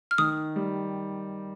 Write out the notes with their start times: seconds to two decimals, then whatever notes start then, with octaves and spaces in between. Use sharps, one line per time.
0.11 F6
0.18 D#3 D#6
0.56 G3